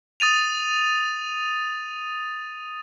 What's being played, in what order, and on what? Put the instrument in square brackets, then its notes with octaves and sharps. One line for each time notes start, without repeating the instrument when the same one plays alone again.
[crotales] D#6 A6 D#7 F7